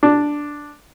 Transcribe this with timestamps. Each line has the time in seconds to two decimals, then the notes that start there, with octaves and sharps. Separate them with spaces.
0.03 D4